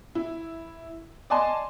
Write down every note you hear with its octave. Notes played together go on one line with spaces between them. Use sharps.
E4
D5 D#5 G#5 A5 C6